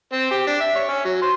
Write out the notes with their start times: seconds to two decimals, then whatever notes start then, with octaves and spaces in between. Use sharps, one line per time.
0.13 C4
0.31 G4
0.47 D4
0.60 E5
0.75 C#5
0.89 C#4
1.05 F#3
1.22 C5